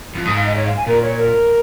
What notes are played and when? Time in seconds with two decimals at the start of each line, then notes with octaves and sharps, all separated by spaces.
0.15 F2
0.25 G#2 D#6
0.36 F5
0.46 D#5
0.56 C#5
0.66 F5
0.77 G#5
0.87 A#2 A#4
1.02 C#5
1.18 A#4